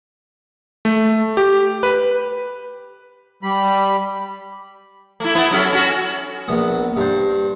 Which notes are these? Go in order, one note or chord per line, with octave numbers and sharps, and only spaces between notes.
A3
G4
B4
G3 B5
A3 E4
A3 B3 E4
F#3 C#4 A4
C#4 F#4
A#1 B3
G2 C5